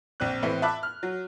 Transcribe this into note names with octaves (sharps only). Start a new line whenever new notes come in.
A#1 C4 F#6
A2 E3 C4 E4 B4
E5 A5 B5 D6 F#6
F6
F#3